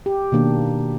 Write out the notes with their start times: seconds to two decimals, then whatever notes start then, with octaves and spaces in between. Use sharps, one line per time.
0.06 G4
0.32 B2 D#3 A#3 D4